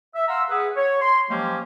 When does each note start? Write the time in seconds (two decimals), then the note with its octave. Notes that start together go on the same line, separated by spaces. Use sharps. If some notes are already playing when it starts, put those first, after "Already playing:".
0.15 E5
0.28 F5 F#5 A#5 C6 E6
0.50 G#4 B4 E5 F#5
0.77 C#5
1.02 C6
1.30 F3 F#3 G#3 A#3 C#4 G4